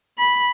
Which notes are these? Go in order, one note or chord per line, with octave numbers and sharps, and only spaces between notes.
B5